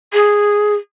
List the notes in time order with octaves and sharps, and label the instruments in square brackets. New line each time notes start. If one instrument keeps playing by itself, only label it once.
[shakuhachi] G#4